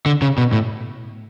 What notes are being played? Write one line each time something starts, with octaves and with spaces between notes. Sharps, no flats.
D3
C#3
B2
A2